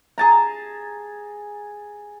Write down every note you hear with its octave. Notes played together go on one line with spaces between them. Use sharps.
G#4 A5 A#5